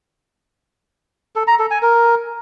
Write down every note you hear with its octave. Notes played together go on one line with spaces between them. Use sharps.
A4
A#5
A4
G#5
A#4